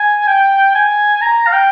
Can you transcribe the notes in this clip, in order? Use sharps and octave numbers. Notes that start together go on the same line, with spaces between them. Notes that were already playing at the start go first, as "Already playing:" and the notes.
Already playing: G#5
G5
G#5
A#5
F5
G5